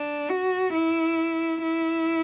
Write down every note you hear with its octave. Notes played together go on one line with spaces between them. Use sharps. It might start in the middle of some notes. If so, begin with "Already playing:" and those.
Already playing: D4
F#4
E4
E4